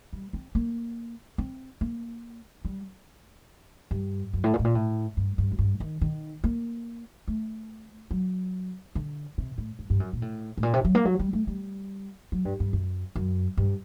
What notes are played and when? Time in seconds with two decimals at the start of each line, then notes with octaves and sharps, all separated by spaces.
0.13 G3
0.33 C4
0.55 A#3
1.38 C4
1.81 A#3
2.65 G3
3.91 G2
4.33 F#2
4.44 A2
4.54 A#2
4.59 A2
4.65 A#2
4.75 A2
5.17 G2
5.38 G2
5.52 F#2
5.59 G2
5.80 D#3
6.01 D#3
6.44 A#3
7.28 A3
8.11 F#3
8.95 D3
9.38 C3
9.58 A2
9.79 G2
9.90 G2
10.00 F#2
10.13 A#2
10.22 A2
10.58 A2
10.63 A#2
10.74 C3
10.85 F#3
10.95 A#3
11.05 F#3
11.19 G3
11.33 A3
11.47 G3
12.32 F#3
12.45 G2
12.60 G2
12.73 F#2
13.16 F#2
13.57 G2